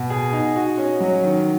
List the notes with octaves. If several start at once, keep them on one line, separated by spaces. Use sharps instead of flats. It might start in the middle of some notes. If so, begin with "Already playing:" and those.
Already playing: B2
G#4
D#4
F#4
C#4
F#3
D#3